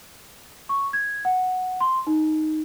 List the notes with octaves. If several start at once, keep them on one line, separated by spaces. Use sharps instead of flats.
C#6
G#6
F#5
C6
D#4